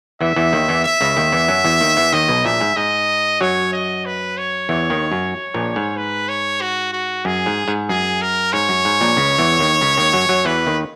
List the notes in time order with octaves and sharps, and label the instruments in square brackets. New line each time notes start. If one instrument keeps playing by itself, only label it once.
[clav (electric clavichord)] E2 E3 [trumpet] E5
[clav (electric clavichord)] E2 E3
D#2 D#3
E2 E3
[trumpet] E5
[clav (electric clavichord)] C#2 C#3
D#2 D#3
E2 E3
F#2 F#3
E2 E3
D#2 D#3
E2 E3
[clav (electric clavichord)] D#2 D#3 [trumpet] D#5
[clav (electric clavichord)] B1 B2
[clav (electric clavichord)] A#1 A#2 [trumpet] E5
[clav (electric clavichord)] G#2
[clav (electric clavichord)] G#2 [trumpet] D#5
[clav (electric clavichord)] F#2 F#3 [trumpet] C#5
[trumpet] D#5
B4
C#5
[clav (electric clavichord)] E2 E3
D#2 D#3
F#2
A#1 A#2
G#2
[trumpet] B4
C#5
F#4
F#4
[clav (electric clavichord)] F#2 [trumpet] G#4
[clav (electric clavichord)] G#2
G#2
[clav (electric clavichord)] F#2 [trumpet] G#4
[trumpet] A#4
[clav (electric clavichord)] G#2 [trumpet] C#5
[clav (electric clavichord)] F#2
G#2
A#1 A#2
C#2 C#3
E2 E3
D#2 D#3
C#2 C#3
D#2 D#3
F#2 F#3
F#2 F#3
[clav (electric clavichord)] E2 E3 [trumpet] B4
[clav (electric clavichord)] D#2 D#3